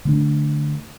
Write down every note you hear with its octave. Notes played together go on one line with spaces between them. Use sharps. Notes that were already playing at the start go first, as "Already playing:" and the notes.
D3 A3 D4